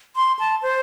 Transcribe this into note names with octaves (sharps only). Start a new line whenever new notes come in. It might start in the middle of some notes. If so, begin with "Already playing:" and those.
C6
A5
C5